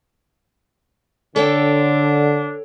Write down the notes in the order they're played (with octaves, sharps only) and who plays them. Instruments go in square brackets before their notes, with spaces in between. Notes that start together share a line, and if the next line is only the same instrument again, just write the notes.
[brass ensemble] D3 [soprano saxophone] D4 [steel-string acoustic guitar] A4 C#5 G5